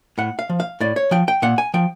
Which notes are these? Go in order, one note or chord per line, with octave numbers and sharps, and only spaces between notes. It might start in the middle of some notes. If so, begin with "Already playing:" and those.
A2 F#5
F5
F3
F5
A2 D5
C#5
F3 G5
G5
A#2 F#5
G#5
F3 G5